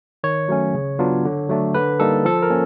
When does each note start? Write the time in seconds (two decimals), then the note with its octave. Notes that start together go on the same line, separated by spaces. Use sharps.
0.24 D#3 C#5
0.48 F#3 A3 C#4
0.75 C#3
0.99 F#3 B3 D4 F4
1.25 D3
1.49 F#3 A3 D4
1.74 D3 B4
2.00 G3 A#3 D#4 A4
2.25 F3 A4
2.42 A#4
2.50 A#3 C#4